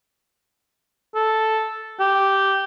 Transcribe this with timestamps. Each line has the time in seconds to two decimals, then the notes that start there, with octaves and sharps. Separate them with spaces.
1.15 A4
2.00 G4